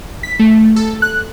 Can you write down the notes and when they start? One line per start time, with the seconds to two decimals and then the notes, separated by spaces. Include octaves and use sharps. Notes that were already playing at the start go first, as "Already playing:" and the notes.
0.23 B6
0.39 A3
0.76 A4
1.02 F#6